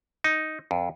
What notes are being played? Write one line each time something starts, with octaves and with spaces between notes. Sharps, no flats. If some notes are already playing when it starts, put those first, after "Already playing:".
D#4
F2